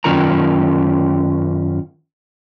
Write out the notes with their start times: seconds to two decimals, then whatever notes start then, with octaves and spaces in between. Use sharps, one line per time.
0.04 F#2 D#3 C#4 F4 A#4 A#5